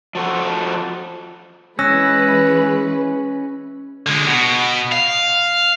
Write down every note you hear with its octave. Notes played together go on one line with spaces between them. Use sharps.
F3 F#4 A4
E3 G#3 C#4 B4 E6 F#6 A#6
D3 G#3
B2
F5